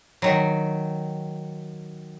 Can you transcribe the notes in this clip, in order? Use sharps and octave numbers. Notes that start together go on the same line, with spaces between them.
D#3 F#3